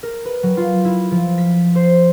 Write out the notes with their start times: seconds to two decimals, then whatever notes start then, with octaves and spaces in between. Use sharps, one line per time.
0.03 A#4
0.25 B4
0.43 F#3
0.57 F4
0.85 E4
1.11 F3
1.38 B6
1.75 C5